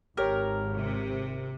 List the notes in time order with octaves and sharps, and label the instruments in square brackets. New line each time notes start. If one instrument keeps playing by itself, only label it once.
[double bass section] G#1 [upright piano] G4 C#5 [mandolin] A#4
[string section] C3